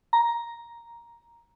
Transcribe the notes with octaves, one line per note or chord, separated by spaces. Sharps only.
A#5